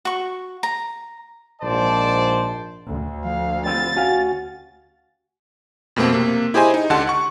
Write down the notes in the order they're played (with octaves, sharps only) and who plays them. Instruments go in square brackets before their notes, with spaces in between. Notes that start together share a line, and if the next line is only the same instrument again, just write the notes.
[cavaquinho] F#4 C#6
A#5
[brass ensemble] A#1 G#2 C5 D5 A5
[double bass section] D2
[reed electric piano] F3 [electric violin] F5
[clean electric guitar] B3 C4 F4 [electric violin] A6
[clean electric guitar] C#4 G4 F5 [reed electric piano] F#4 F#5 G#5
[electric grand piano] F2 B2 A3 A#3 C4
C3 A#3
E4 G4 G#4 C5 D#5 G#5
D#4
C#2 D3 G4 F#5 A5 C6
F#5 C#6